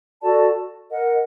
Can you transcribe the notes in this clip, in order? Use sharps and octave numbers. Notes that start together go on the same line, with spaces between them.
F#4 A4 D5 A5
A#4 D#5 F#5